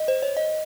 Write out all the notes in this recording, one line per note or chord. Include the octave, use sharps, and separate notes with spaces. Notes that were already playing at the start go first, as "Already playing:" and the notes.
Already playing: D#5
C5
C#5
D#5